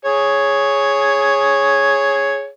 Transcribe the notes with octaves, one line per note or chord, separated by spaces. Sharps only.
G#4 C#5